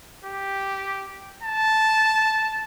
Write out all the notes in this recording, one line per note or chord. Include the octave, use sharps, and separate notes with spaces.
G4
A5